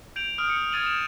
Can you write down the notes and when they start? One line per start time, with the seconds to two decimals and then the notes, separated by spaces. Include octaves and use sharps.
0.16 G6 D7 F7 F#7
0.38 D#6 F6 D7
0.50 C#7
0.72 D#6 G#6 A6 D#7 F#7
0.86 E7